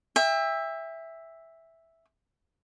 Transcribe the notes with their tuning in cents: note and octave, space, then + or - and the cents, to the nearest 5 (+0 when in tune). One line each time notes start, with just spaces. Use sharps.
E5 +0 G5 +40